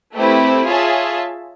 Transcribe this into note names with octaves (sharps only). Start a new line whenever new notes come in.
A3 C4 E4 G4 B4
F4 G#4 C#5 E5 A5